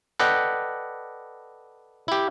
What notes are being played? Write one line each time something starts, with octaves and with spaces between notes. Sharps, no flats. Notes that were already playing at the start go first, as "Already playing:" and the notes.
A4 B4 D5 D#5 F#5 G5
E4 G4